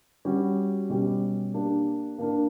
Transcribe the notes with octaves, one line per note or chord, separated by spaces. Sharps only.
G3 C#4 F#4
B2 G3 C#4 G4
A#3 D4 G4
A#3 D4 A#4